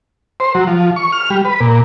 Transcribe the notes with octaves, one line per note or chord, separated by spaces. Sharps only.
C5
F#3
F3
C#6
F6
G3
B4
A#2